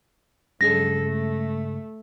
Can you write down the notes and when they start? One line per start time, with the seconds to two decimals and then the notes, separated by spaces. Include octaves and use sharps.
0.61 G2 C#3 F#3 G#3 A4 A#6
1.05 A3